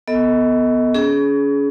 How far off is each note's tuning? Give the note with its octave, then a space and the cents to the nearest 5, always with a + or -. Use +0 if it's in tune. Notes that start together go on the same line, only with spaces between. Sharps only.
B3 +0 A4 +20 D#5 +25
C#4 +35 G#4 +25